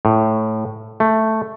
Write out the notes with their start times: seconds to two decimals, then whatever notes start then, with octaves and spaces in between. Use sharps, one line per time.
0.05 A2
1.00 A3